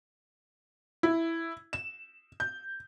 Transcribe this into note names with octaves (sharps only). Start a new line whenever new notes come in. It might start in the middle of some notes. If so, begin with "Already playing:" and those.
E4
E7
G6